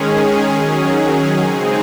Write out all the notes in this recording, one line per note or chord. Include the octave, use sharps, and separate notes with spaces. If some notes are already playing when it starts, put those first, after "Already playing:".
Already playing: D#3 G#3 C#4 G#4
D#3 F#3 C#4 G#4
C#3 G#3 C4 D#4 G#4